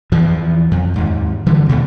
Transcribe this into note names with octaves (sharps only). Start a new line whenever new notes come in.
E2 E3 F3
F2
D#2 G#2
D3 E3 G3
D#2 B2 D3 A3